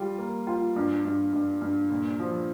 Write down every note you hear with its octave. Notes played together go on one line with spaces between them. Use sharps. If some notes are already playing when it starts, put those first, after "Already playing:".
Already playing: G3 F4
A#3
F4
G2
G2
G2
G2
A#2
F3